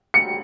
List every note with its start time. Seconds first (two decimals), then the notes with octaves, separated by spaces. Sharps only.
0.14 C#7